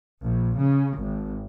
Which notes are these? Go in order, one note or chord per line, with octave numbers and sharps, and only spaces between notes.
A#1
C#3
G#1